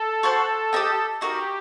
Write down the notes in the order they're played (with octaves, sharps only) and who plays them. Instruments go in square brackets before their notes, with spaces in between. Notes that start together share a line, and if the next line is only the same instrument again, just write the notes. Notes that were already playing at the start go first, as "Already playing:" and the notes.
Already playing: [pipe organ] A4
[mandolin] F#4 C5 F#5 A5
G4 A#4 D#5 G5
[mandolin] D#4 F#4 A#4 [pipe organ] G4